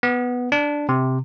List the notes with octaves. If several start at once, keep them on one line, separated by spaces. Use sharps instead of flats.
B3
D4
C3